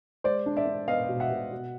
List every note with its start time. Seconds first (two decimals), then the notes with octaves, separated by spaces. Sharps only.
0.24 G#3 C5 D5
0.46 D4
0.57 D5 E5
0.67 D4
0.88 B3 D#5 F5
1.09 B2
1.20 E5 F#5
1.31 B2
1.51 B2